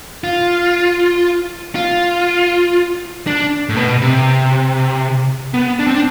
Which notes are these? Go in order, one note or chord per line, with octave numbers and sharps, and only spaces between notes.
F4
F4
D4
A2
B2
C3
B3
D4
C4
D4